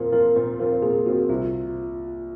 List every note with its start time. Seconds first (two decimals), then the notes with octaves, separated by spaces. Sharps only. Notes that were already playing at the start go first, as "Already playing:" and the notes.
Already playing: A#2 F3 C4 F4 A#4 C5
0.12 F3 C4 F4 A#4
0.36 A#2 C5
0.59 F3 C4 F4 A#4
0.82 A#2 G#4
1.06 F3 C4 F4 F#4
1.29 C2 F4